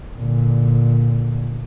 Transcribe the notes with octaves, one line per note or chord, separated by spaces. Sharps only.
A#2 D3